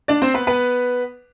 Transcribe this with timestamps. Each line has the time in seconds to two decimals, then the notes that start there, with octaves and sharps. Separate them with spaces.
0.08 D4 D5
0.22 C4 C5
0.34 B3 B4
0.47 B3 B4